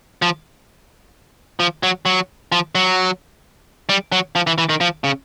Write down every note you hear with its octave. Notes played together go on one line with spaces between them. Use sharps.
F3
F3
F#3
F#3
F3
F#3
G3
F#3
F3
E3
E3
D#3
F3
C#3